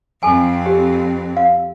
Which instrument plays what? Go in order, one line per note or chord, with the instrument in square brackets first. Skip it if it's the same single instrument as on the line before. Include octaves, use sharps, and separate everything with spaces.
[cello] F2 C4 [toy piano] A4 G#5
[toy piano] G4
F5